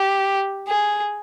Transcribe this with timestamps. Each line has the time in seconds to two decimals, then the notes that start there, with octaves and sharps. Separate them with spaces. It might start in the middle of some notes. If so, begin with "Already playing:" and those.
Already playing: G4
0.68 G#4